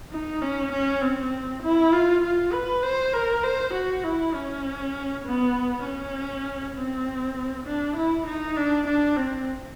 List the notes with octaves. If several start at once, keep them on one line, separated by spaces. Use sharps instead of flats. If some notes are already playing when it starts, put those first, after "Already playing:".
D#4
C#4
C#4
C4
E4
F4
F4
B4
C5
A#4
C5
F#4
E4
C#4
B3
C#4
C4
D4
E4
D#4
D4
D4
C4